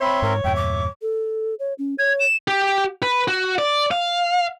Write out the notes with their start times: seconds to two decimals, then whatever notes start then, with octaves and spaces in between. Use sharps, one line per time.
0.01 C4 C#5 E5 B5 C6
0.22 G#2 A#4
0.44 E2 G2 A#2 E5 G5
0.55 D6
1.02 A4
1.59 C#5
1.78 C#4
1.98 C#5 G#6
2.19 E7
2.48 G4
3.03 B4
3.28 F#4
3.58 D5
3.91 F5